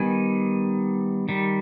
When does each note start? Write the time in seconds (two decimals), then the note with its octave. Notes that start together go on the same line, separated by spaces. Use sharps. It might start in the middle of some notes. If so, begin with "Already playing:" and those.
Already playing: D#3 G3 B3 G#5
1.29 D#3 G3